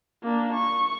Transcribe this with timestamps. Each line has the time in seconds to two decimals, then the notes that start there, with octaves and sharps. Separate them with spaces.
0.23 A#3 D4
0.53 C#6